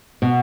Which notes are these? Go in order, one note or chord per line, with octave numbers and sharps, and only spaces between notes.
B2